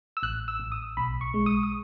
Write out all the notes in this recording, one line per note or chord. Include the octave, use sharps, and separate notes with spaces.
E6
A1 F#6
E6
A1
D#6
B1 B5
C#6
G#3
D#6
D#6